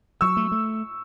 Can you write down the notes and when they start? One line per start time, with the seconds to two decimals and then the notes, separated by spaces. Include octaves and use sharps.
0.21 F#3 C#6 E6
0.37 A3
0.52 A3